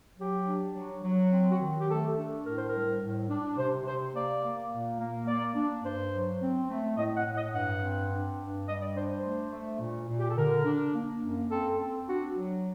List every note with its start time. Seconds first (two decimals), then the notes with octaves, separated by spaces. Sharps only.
0.18 F#3 G4
0.46 D4
0.75 F#3
1.03 F#3
1.31 C4
1.50 F#4
1.60 D#3
1.78 G4
1.88 A3 A4
2.16 D4
2.44 A2 A#4
2.56 C5
2.67 A#4
2.72 G3
3.01 A2
3.29 D4
3.58 C3 C5
3.85 C3 C5
4.14 A#3 D5
4.43 A#3
4.71 A#2
4.99 A#3
5.27 A#3 D5
5.56 D4
5.84 G2 C5
6.12 F#3
6.41 C4
6.69 A3
6.97 A2 D#5
7.16 F#5
7.25 A2
7.35 D#5
7.54 G2 F#5
7.82 C4
8.10 D4
8.39 G2
8.67 G3 D#5
8.81 D5
8.95 D4 C5
9.10 C5
9.24 A3
9.52 A3
9.80 A#2
10.08 A#2
10.19 G4
10.28 A4
10.37 D3 A#4
10.65 D4
10.93 A#3
11.22 F#2
11.50 C4 A4
11.79 C4
12.07 D4 F#4
12.35 F#3